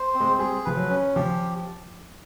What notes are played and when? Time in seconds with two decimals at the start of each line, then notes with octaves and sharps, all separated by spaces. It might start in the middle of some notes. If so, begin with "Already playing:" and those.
Already playing: C5
0.14 C4
0.20 G#3
0.39 G3 G#4
0.65 F3 B4
0.77 F#3
0.90 C#4
1.15 F3 G4